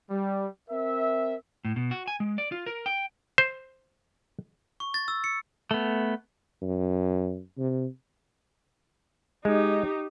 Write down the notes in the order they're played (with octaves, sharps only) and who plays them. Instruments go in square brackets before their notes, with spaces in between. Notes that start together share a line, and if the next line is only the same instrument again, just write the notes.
[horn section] G3
C4 A#4 E5
[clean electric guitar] A2
B2
F#4
G#5
G#3
D5
F4
A#4
G5
[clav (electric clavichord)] C5
[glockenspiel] C#6
A6
E6
C#7
[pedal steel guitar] A3 B3
[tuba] F#2
C3
[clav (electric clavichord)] G#3 [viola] D#4 G4